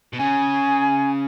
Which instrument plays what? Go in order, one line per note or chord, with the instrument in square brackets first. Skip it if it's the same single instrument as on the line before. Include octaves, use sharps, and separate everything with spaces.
[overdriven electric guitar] B2
[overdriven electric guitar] C#3 [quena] G#5